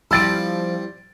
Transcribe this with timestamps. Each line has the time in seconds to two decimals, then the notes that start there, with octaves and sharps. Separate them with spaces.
0.11 F3 G3 C4 E4 E6 A6 D7